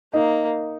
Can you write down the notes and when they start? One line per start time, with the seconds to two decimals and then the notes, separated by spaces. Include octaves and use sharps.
0.13 A#3 D#4